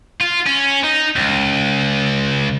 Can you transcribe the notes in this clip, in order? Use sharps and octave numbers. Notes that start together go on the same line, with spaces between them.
F4
C#4
D#4
C#2